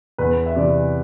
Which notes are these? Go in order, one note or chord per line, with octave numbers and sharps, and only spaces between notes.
E2 B4
E5
C3 E3 D5